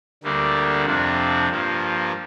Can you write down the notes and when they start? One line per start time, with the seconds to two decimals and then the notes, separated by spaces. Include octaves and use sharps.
0.23 D2 D3 G3 A#3 D4
0.85 F2 C3 F3 D4
1.49 G2 F3 A#3